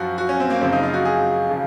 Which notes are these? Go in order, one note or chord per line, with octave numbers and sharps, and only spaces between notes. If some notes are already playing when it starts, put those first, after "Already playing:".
Already playing: F#2 F3 F#4
F#4
C#4
C4
A#3
F#2 C#3 F3 C4
D#4
F4
F#4
G#4
C#3 F3